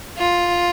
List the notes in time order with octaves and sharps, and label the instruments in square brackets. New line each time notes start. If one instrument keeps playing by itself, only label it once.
[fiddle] F4